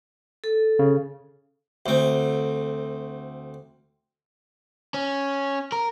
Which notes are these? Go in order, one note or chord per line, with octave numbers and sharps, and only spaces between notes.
A4
C#3
D2 C4
C#4
A#4